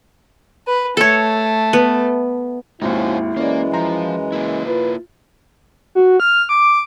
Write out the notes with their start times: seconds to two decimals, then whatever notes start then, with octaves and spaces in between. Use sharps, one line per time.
0.68 B4
0.97 A3 A4 C#5
1.73 B3
2.82 G#1 D#2 F3 C#4 D#4 E4 F#4
3.37 F#2 E3 G#3 A#3 C#4 D5
3.74 F3 A#5
4.32 A#3 E4
4.67 F4 B4
5.95 F#4
6.20 F6
6.49 D6